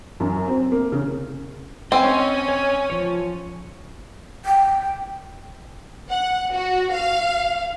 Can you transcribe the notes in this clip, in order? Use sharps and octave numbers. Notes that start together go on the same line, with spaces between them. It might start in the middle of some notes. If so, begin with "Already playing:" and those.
F#2
C4
A#3
C#3
C4 C#4 D#5 G#5 E6
C#5
F3 C#5
G5
F#5
F#4
F5